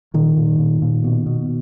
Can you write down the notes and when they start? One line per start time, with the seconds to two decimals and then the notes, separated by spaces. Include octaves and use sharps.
0.14 A#2 D#3
0.37 A#2
0.59 A#2
0.82 A#2
1.04 B2
1.26 B2